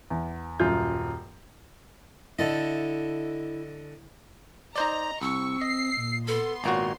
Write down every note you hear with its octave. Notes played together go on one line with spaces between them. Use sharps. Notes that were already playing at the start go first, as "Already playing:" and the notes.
E2
D#1 F#2 F4 G6
D3 E4 A4 D#5
D#4 C5 D5 D#5 A#5
C2 C4 C#6 E6
D#5 C7
A#2
B3 A4 C6
G#1 A#2 F#4 C#5 A#5